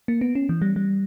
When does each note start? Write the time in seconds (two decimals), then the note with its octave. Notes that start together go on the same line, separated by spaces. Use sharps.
0.08 A#3
0.21 B3
0.35 C#4
0.49 E3
0.62 G3
0.76 G3